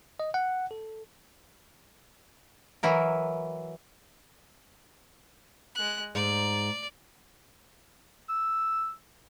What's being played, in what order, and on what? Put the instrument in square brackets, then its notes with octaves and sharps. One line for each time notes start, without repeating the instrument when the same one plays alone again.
[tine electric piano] D#5
F#5
A4
[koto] E3 F#3 E4 A#4
[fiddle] G#3 F#6
[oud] G#2 [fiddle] D5
[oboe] E6